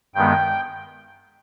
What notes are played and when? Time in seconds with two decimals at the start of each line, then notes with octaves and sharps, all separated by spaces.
0.15 G2 D#3 G#3 B3 G5